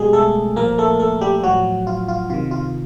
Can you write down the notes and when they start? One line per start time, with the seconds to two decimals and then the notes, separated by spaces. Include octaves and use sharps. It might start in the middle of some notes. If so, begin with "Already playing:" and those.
Already playing: B2 G3 G#3 G4 G#4
0.13 A3 A4
0.56 A#2 F3 A#3 A#4
0.78 A3 A4
0.99 A3 A4
1.21 G3 G4
1.43 A2 F3 F#3 F#4
1.87 F4
2.08 F4
2.30 C3 D#3 F4
2.51 F4